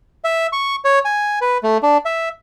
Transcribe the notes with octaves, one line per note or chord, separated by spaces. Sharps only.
E5
C#6
C#5
G#5
B4
A3
D4
E5